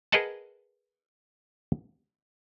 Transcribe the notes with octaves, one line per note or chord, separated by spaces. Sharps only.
G#4 A#4 B4 D#5 F#5 A5